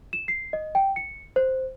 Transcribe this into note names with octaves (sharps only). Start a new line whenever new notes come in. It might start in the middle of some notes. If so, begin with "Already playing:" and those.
E7
C7
D#5
G5
C#7
C5